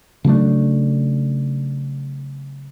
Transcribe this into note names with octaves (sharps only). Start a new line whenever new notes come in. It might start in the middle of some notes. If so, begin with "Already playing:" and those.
C#3 F#3 A3 D4